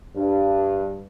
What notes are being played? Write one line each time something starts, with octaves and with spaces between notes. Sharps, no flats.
G2